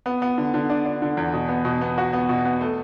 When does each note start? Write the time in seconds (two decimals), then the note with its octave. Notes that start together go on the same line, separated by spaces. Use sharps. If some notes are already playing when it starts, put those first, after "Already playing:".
0.06 B3
0.22 B3
0.38 D3
0.54 D3
0.70 D4
0.85 D4
1.02 D3
1.17 E2
1.33 B2
1.49 B3
1.65 B2
1.81 B3
1.98 F#4
2.13 B3
2.29 B2
2.45 B3
2.61 A3